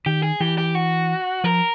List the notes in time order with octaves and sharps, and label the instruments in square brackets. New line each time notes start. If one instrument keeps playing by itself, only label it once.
[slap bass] D#3 [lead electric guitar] G4
[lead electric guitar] G#4
[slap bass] E3 [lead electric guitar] G4
[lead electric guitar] G4
F#4
[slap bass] F3 [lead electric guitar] A#4